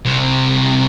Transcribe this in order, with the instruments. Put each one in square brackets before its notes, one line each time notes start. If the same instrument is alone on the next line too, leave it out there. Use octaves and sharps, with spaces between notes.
[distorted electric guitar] C2 C3